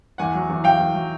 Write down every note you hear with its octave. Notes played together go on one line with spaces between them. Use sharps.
E2 F#5 G#5
F#3
E2
F#3 F5 G5
E2
F#3